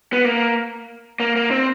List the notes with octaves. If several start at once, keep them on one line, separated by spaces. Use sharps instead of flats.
B3
A#3
A#3
A#3
C4